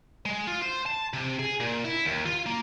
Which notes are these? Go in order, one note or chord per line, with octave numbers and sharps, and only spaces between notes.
G#3
F4
C5
A5
C3
G#4
A#2
E4
D#2
F4
A#3